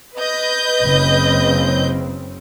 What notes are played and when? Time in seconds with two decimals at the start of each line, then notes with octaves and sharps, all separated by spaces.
0.16 B4 D#5 G6
0.85 F#1 C#3 C4